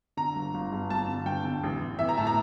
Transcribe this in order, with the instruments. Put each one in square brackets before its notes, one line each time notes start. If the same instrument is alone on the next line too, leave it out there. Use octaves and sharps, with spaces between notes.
[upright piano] D3 A#5
G1
G1
G2
G1 A5
D3
G1 G5
D3
A1
A1
E3 E5
A#5
A2 A5
A#5